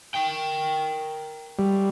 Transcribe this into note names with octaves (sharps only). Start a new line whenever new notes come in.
A#4 G5
G3